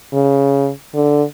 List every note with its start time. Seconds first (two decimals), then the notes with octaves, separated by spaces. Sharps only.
0.13 C#3
0.95 D3